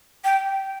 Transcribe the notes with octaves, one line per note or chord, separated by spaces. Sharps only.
G5